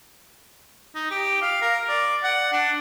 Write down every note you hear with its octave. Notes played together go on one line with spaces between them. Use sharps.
D#4
G4
F5
A#4
D5
F#5
D4